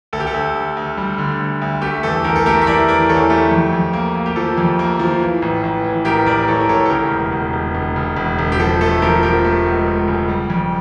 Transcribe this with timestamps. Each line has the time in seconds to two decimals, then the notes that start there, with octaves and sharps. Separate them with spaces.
0.13 D2 A4
0.20 G4
0.27 A4
0.34 D2
0.55 D2
0.77 D2
0.97 G3
1.18 D3
1.40 D2
1.61 D2
1.82 A3 G4
2.03 E2 A4
2.24 E2 G4 A#4
2.36 A4
2.46 A3 G4 A#4
2.62 E5
2.67 E3 A#4 D5
2.88 E3 A#4 D5
3.09 E2 A4 C#5
3.30 A3 G4
3.51 F2
3.73 F2
3.93 A#3
4.15 A#3
4.26 G4
4.36 F3 A4
4.57 F2
4.79 A#3
4.99 F3
5.21 E3
5.42 A1
5.63 A1
5.84 E3
6.05 A1 G4 A#4
6.26 A1 A#4 D5
6.38 A#4
6.48 E3 A4 C#5
6.60 A#4
6.69 A1 A4 C#5
6.85 A4
6.90 C#3 G4 A#4
7.11 E1
7.32 E1
7.53 E1
7.75 E1
7.96 C#3
8.17 E1
8.39 E1
8.52 G4
8.59 F3 A4
8.81 A3 A4
9.02 F3 G4 A#4
9.23 F3 G4 A#4
9.45 A3
9.66 C#2
9.86 C#2
10.08 C#3
10.29 G3
10.50 F2